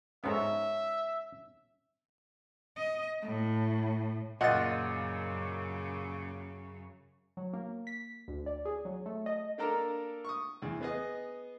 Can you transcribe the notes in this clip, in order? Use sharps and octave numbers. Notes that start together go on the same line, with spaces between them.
G#2 B3 C#4 A4 E5 A#5
D#5
A2
F#2 A#2 C#3 F4 D#5 F#5 A6
F#3
A#3
B6
D2
D5
G#4
F#3
A3
D#5
A#3 D4 A4 A#4 A#5
C#6 D#6
E2
B3 G#4 D#5